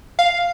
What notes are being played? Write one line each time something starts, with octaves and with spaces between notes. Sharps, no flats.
F5